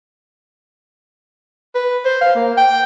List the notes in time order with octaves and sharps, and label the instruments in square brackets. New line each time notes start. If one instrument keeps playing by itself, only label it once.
[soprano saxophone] B4
C5
F5
A#3
G5